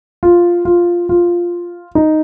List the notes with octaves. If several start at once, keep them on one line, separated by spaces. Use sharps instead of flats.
F4
F4
F4
D#4